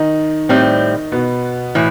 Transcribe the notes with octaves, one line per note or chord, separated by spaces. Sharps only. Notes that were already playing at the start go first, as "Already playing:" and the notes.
Already playing: D#3 D#4
A2 G3 C4
B2 B3
A2 E3